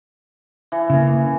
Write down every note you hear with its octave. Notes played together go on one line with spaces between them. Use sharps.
E3
C#3 A#3